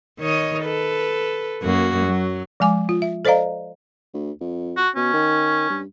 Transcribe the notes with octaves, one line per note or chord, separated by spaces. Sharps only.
D#3 C#5 D#5
A4 B4
F#2 A#3 F#4
F#3
F3 G#3 G#5 D6
F4
E5
A4 C5 D5 D#5 F5 A#5
D2
F2
F#4
B2 C#4
D#3
G2